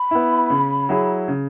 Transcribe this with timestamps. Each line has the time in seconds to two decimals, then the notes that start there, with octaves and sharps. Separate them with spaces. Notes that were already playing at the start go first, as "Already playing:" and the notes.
Already playing: B5
0.11 B3 E4
0.50 C#3
0.89 F#3 E4 G#4
1.28 C#3